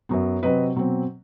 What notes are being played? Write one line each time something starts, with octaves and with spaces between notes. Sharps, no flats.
F#2 F#3 B3
C3 F#3 C4 B4 D#5
B2 F#3 C4